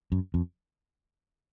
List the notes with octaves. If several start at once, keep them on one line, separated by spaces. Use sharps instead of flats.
F#2
F2